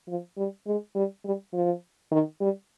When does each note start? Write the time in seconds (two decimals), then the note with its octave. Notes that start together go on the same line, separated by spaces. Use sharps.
0.09 F3
0.37 G3
0.67 G#3
0.96 G3
1.25 G3
1.54 F3
2.12 D#3
2.41 G3